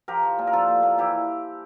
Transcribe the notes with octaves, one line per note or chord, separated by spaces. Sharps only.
F3 G4 A#4
F3
A#2
A#4
F3 F4 A4
A#2
A#2
E3 E4 G4